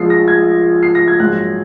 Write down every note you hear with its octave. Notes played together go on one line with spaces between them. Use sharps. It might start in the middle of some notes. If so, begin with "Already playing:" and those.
Already playing: A#1 A#2 F3 G#3 C7
A#6
G#6
C7
A#6
G#6
A#1 G#2 F#3 F#6